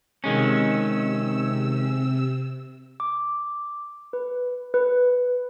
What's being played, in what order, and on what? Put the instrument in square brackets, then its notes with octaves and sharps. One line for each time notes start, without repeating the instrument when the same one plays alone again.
[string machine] C3 E6 [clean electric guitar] D#3 G#3 C#4
[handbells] D6
B4
B4